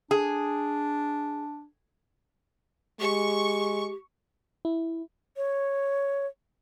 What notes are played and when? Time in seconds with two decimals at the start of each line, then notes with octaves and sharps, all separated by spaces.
0.11 D4 G#4
3.00 G#3 G4 C#6
4.65 E4
5.37 C#5